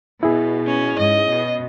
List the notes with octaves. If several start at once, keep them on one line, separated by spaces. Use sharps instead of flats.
B2 E4 G#4
C#4
G#2 C#4 D#5
B2